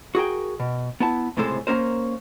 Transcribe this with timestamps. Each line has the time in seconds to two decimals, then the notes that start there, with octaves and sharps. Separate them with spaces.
0.15 F#4 G#4 A#4 G5
0.60 B2
1.00 B3 E4 A5
1.37 C#2 A2 C3 G#3 A4 C5
1.67 A#3 C4 C#4 A#4 C5